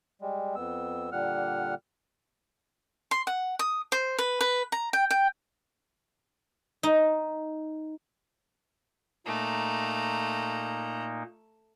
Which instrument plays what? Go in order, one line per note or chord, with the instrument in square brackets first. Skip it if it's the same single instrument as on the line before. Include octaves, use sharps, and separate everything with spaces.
[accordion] G3 G#3
F2 B3 E6
A#2 D3 G3 F#5 F6
[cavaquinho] C6
F#5
D#6
C5
B4
B4
A#5
G5
G5
[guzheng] D#4
[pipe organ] A#2 A#3 D#4 [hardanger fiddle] A3 A#5